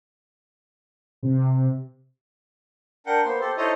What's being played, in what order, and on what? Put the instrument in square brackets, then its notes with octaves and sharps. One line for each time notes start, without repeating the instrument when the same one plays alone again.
[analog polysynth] C3
[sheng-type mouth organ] D4 A#4 F#5 G5
A#3 B3 C5
G4 A4 C5
D#4 E4 A4 C5 C#5 D#5